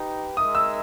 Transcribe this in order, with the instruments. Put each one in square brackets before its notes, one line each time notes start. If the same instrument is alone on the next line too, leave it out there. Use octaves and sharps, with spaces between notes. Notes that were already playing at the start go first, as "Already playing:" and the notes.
Already playing: [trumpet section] D#4 G4 B4 G5
[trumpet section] G#3 D#4 A#4 E5 [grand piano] D#6
[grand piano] E6